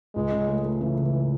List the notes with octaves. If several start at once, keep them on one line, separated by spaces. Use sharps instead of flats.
C#2 G#3
C#3
A3
A3
C#3 E3
C#3